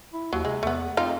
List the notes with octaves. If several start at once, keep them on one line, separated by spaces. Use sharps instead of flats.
E4
D#2 F#3
C3 G#3
E2 A3 B3
F2 D#4 F4